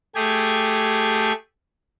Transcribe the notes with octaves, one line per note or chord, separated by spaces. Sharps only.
A3 G4 G#4 G#6